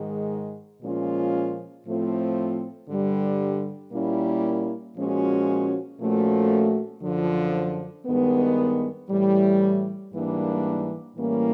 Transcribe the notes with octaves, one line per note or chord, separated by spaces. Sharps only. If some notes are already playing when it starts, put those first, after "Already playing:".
Already playing: G#2 D#3 G#3
A#2 F3 G#3 C#4 F4
A2 F3 A3 C4 F4
G2 D3 G3
A#2 G3 A#3 C#4 E4
A#2 F3 G#3 C#4 F#4
A#2 F3 A3 C#4 F#4
F#2 D3 F3
G2 D#3 G#3 B3
A2 E3 G3
G#2 E3 G3 A#3 D4
A2 E3 G3 A#3 C#4